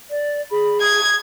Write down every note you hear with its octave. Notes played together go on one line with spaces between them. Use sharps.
D5
G#4 B5
D#6 G#6